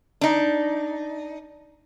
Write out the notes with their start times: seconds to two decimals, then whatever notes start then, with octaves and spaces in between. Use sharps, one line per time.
0.21 D4 D#4